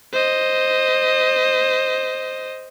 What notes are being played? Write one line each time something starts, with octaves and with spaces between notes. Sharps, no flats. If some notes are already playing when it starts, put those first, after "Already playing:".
C5 D#5